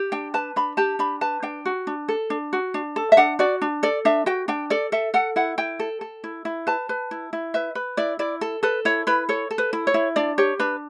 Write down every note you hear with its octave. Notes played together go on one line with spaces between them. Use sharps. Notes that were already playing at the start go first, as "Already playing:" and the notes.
Already playing: G4
D4 G5
B4 A5
D4 B5
G4 A5
D4 B5
B4 A5
D4 G5
F#4
D4
A4
D4
F#4
D4
A4
E5
D4 F#5
F#4 D5
D4
A4 D5
D4 E5
F#4 G5
D4 G5
A4 D5
A4 E5
A4 F#5
E4 F#5
E4 G5
A4
A4
E4
E4
B4 A5
B4
E4
E4
B4 E5
B4
E4 D5
E4 D5
A4
A4 B4
E4 C#5
E4 B4
A4 C#5
A4
B4
E4
C#5
E4
D4 D5
G4 C#5
D4 B4